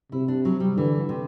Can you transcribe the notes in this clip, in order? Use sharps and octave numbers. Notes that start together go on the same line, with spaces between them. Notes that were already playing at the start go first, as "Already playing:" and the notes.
C3 E4
D4
F#3
G3
D3 E3
C3